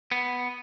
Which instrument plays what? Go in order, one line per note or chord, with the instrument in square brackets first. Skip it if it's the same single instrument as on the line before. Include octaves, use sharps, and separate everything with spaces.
[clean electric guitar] B3